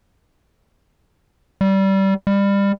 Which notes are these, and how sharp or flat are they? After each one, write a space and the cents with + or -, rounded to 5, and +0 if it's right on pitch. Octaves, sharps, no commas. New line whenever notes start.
G3 -20
G3 +25